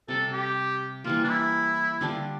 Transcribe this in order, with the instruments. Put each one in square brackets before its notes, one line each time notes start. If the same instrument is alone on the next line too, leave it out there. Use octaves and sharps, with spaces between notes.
[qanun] C3 G3 C4 [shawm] A4
[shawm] G4
[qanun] E3 G3 A#3 [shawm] F4
[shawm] D4
E4
[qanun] D3 G3 D4 F4